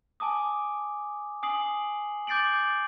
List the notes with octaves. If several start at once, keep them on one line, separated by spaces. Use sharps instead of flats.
G#5 A5 D6 D#6
G#5 D#6 C7 F#7
D6 G6 A6 C7 D7 F#7